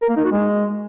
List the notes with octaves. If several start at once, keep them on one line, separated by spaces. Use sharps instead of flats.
A#4
A#3
D#4
F#4
G#3